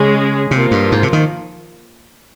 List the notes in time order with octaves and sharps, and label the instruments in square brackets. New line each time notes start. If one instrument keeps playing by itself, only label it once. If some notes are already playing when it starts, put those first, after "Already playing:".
Already playing: [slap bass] C#3 [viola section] G#3 C#4 G#4
[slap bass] C3 [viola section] F3 A#3 F4
[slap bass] G2
G#2
C3
D#3